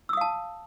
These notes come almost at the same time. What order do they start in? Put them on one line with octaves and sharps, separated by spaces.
E6 D#6 F5 A5